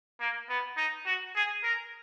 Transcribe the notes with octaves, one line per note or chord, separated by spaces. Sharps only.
A#3
B3
D#4
F#4
G#4
A#4